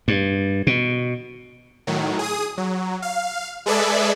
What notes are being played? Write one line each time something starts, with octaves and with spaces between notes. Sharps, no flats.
G2
B2
A2 D#3 F#3
G#4 D#6
F#3
F5
G#3 G#4 A4 B4 D5 E5